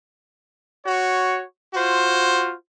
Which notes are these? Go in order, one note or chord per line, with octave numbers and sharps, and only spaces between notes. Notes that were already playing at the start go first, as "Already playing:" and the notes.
F#4 C#5
F4 F#4 C5